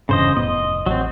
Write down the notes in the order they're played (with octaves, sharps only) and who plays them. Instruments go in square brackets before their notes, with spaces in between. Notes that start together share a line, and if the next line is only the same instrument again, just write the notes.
[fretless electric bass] E1 G2 E3 [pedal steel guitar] C#3 C5 D#5
[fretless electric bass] F1 A2 B3 [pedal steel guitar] D#5
[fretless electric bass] A1 [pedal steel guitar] F#3 C4